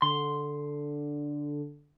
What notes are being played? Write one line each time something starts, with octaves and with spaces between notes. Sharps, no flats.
D3 C6